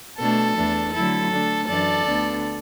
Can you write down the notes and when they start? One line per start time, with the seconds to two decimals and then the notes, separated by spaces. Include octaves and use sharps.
0.18 B2 A3 D4 A4
0.56 E2 E3 A3 D4
0.93 D3 F#3 A3 E4 A4
1.30 D3 A3 D4
1.67 F#2 E3 D4 A4 D5
2.05 D2 D3 B3 D4